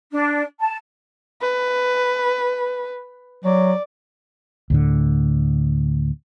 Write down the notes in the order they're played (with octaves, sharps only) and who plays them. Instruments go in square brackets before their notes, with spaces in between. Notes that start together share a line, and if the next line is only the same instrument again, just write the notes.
[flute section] D4
A5
[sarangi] B4
[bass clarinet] F#3 [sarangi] D5
[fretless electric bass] D2 A2 D3